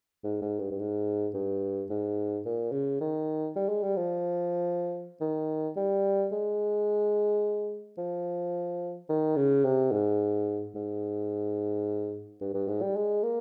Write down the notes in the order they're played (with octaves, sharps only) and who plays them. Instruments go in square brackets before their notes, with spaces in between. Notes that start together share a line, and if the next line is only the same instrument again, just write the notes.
[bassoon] G#2
G#2
G2
G2
G#2
G2
G#2
A#2
C#3
D#3
G3
G#3
G3
F3
D#3
G3
G#3
F3
D#3
C#3
C3
G#2
G#2
G2
G2
G#2
G3
G#3
A#3